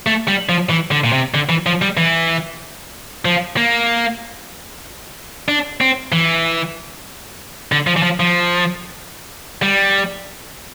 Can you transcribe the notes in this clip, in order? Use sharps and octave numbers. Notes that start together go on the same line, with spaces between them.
A3
G3
F3
E3
D3
A#2
C3
D3
E3
F3
G3
E3
F3
A#3
D4
C4
E3
D3
F3
E3
F3
F3
G3